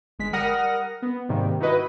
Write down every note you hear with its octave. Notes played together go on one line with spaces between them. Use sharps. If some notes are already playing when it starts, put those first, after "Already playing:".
G1 G#3 B6
G3 A#4 F#5 D#6 F6 A#6
B3
G#2 C3 D#3 G3 A#3
D#4 E4 F#4 B4 D#5